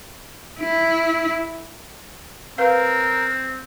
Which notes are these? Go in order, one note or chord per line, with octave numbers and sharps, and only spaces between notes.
E4
C4 A#4 B4 F5